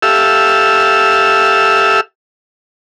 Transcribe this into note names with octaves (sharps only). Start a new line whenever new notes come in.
G4 A4 E5 F5 E6